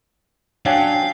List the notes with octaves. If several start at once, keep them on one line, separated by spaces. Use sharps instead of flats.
F#3 C#4 D4 F5 G5